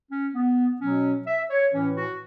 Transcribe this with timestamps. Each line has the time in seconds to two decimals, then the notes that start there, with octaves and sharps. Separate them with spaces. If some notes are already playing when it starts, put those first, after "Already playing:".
0.11 C#4
0.35 B3
0.81 B2 F#3 C#4
1.27 E5
1.50 C#5
1.74 A2 E3 C#4
1.97 F#4